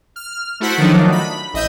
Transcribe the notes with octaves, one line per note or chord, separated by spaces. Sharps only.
F6
A3 E4 F#4 C5 B6 D7
D#3 F3 F#3 A3 D4 D#4
B5
A1 D#5 E5 G6